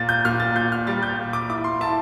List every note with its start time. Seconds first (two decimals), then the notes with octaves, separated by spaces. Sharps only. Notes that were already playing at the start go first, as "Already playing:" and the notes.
Already playing: A#2 A6
0.09 G6
0.25 A#2 F6
0.40 A6
0.55 A#2 G6
0.72 F6
0.87 G3 A6
1.03 G6
1.18 A#2
1.33 D6
1.50 E4 D6
1.64 C6
1.81 E4 A5